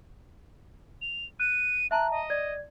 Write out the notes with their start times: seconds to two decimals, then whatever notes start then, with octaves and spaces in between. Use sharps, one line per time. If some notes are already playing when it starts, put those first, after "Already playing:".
1.02 F7
1.40 F#6 D#7
1.91 E5 A5 A#5 F#6
2.11 D#5
2.30 D5 G#6